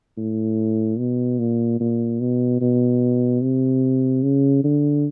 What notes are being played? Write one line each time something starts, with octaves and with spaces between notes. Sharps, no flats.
A2
B2
A#2
A#2
B2
B2
C3
C#3
D3